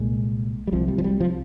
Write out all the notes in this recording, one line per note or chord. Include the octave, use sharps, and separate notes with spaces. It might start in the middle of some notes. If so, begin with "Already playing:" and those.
Already playing: C2 A#2 G#3
G3
C2 C3 F3
G3
F3
G3
F3